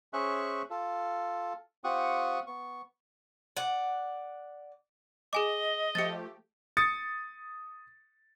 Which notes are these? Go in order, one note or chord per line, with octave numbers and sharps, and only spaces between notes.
C#4 G#4 C5 E5 C#6 F#6
F4 A4
C4 F4 G4 F#5 C#6 D#6
B3 C#6
D5 F#5
G#4 D#5 G#5 D6
F3 A3 G4 A6 C#7
D#6 A6 C#7